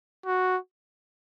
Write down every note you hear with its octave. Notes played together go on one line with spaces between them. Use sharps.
F#4